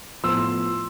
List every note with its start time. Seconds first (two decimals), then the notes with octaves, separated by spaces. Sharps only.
0.24 A2 F3 B3 C6 E6